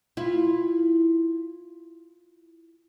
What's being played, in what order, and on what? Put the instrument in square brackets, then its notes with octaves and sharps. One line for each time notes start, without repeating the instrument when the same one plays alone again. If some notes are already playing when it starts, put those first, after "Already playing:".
[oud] E4 F4